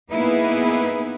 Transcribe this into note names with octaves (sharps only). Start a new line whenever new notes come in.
A#3 B3 D#4 E4 G#4 B4